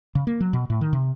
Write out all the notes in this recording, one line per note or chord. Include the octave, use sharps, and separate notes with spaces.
C#3
A#3
F#3
B2
A2
D#3
C3